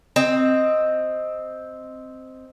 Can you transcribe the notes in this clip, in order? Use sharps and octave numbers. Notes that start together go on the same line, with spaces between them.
C4 D#5